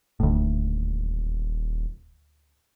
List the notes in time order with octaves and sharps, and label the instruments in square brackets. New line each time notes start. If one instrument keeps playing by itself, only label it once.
[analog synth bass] D#1 [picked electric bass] D2 A2